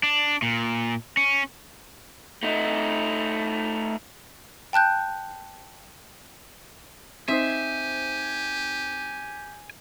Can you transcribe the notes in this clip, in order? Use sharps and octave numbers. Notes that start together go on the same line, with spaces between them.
D4
A#2
C#4
A3 D#4
G5 A5 F#6 G6
C4 D#4 G4 C5 E5 G#5